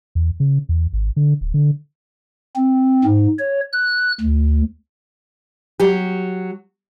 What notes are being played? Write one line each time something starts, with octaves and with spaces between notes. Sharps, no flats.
E2
C#3
E2
G#1
D3
D1
D3
C4
G#2
C#5
F#6
D2
F#3 G4